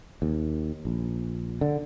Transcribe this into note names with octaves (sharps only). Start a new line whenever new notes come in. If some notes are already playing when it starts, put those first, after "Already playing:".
D#2
A#1
D3